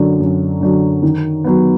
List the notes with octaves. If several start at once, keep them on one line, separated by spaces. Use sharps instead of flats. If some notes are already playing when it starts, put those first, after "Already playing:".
Already playing: F#2 D3 F#3 D4
F#2
D3 F#3 D4
D#3
F#3 B3